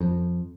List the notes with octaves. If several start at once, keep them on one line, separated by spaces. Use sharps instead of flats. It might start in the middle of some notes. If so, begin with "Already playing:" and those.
F2